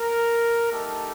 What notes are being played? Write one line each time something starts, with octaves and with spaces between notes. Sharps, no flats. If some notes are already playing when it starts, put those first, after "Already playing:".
Already playing: A#4
A3 D#4 G4 A4